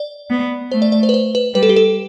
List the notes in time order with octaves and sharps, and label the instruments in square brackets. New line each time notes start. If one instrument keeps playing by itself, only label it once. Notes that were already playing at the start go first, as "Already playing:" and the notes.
Already playing: [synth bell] D5
[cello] B3
[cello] A3 [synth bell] C5
[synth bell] D5
D5
C5
B4
C5
B4
[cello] G3 [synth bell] B4
[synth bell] A4
G4
A4